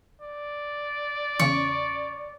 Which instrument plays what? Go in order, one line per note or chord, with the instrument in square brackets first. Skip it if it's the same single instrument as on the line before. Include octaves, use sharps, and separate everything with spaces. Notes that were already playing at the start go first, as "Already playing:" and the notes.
[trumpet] D5
[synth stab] E2 C#3 [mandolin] C#5